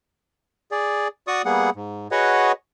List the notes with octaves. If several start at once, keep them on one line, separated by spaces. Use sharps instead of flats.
G#4 D5
F#4 D5 C#6 D#6
G3 A#3 B3 G#4 F#5
G#2
F#4 G#4 B4 C#5 D#5 F#5